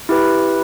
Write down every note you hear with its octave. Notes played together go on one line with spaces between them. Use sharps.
E4 G4 B4